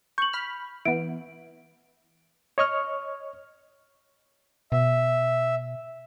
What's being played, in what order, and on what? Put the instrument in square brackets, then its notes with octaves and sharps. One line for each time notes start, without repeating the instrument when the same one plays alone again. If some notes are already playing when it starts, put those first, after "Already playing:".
[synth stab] C#6 [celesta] G6 F#7
[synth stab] B5 F6
[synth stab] E3 B3 [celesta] D7
[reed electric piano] C#5 D#5 C#6 F6
[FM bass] B2 [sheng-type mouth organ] E5